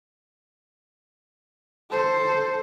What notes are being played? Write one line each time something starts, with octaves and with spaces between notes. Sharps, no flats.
A4 C5